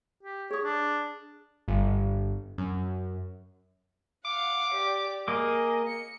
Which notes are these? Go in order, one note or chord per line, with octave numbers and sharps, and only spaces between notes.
G4
G#4 C#5 D#6
D4
G1
F#2
F5 F#5 D6
G4 D5
A#3 G#4 D#5 D6
C#7